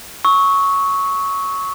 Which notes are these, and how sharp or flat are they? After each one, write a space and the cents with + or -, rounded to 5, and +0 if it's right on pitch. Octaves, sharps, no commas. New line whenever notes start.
C#6 +0 E6 -30